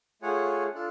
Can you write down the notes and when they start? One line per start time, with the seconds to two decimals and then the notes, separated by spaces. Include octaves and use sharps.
0.22 A3 F4 G#4 C#5 F#5
0.74 D4 F4 A4